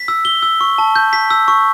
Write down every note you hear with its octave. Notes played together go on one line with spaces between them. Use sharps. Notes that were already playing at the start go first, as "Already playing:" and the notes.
Already playing: B6
E6
G7
E6
C#6
A5
G6
B6
E6
C#6